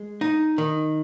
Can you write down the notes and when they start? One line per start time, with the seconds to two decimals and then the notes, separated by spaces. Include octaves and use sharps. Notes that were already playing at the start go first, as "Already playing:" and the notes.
Already playing: G#3
0.21 D#4
0.58 D#3